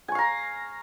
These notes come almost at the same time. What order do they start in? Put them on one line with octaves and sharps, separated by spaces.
G#5 C#6 F5 A#5